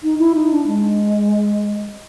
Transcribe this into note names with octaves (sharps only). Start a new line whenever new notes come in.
D#4
E4
D#4
D4
G#3